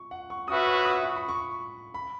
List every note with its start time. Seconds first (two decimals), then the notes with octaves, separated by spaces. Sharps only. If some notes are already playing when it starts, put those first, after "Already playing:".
Already playing: C#6
0.11 F#5
0.30 C#6
0.48 C#4 F#4 B4 E5 D#6
0.66 C#6
0.85 D#6
1.03 C#6
1.16 B5
1.29 C#6
1.94 B5